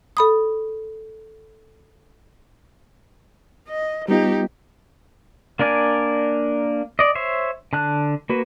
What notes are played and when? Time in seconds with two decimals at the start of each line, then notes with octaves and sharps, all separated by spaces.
0.17 A4 B5 D#6
3.69 D#5
4.08 G3 B3 D#4 F4 G4
5.59 A#3 D4 A#4 D5 G#5
6.99 D5 D#5
7.15 C5 C#5 E5
7.73 D3 A5 F#6
8.30 A#3 F#4 B4